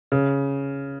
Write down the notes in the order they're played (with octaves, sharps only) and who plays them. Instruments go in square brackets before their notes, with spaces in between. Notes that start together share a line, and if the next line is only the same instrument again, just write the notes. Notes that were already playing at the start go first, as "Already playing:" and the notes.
[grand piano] C#3